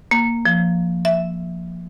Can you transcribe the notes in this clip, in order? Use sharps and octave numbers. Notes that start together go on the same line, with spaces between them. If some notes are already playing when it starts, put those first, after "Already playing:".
A#3
F3
E5